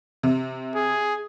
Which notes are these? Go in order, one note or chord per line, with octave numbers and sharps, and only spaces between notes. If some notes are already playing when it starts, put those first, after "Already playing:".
C3
G#4